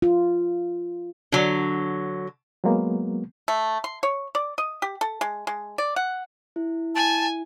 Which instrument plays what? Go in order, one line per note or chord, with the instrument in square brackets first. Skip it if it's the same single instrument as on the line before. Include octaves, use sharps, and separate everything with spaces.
[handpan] F4
[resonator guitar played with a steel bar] D3 F#3
[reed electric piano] F#3 G#3 A#3 B3
[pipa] A3
C6
C#5
D5
D#5
G4
A4
G#3
G#3
D5
F#5
[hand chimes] E4
[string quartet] G#5 [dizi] A5